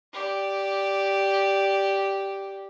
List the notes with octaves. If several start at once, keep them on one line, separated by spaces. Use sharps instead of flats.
G4 D5